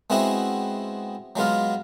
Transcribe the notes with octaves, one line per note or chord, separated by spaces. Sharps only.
G#3 B3 C4 E4 F#4 G#4
F#3 G#3 B3 F4